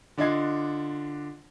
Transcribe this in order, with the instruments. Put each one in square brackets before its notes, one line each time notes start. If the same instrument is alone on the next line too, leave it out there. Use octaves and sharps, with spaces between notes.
[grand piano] D3 D4 F4 D#5 G#6 C7